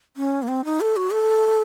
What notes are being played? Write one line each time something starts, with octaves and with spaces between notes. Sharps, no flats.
C#4
A#3
C4
D#4
A4
F#4
A4